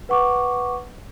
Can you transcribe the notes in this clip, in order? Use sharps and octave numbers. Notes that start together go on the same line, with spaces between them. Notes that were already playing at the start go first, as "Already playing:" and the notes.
B4 F#5 C#6 D6